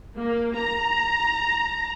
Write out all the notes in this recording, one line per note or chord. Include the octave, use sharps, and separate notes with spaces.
A#3
A#5